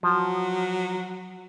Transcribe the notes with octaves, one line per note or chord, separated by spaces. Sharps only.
F3 F#3